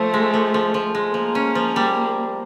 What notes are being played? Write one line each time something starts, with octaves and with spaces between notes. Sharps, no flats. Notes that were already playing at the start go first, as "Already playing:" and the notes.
Already playing: F3 A3
G#3
F3
F3
F3
G#3
F3 A#3
C#4
F3
G3